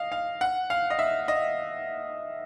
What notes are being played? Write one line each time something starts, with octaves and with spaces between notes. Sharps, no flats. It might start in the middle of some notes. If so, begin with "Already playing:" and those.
Already playing: D#5 F5
F5
F#5
F5
D#5
E5
D#5